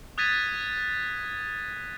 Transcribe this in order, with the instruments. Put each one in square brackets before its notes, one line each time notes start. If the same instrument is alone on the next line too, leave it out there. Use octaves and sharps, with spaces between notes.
[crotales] D#6 F#6 G#6 A6 B6 D#7